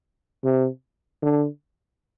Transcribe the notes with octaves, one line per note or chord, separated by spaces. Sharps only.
C3
D3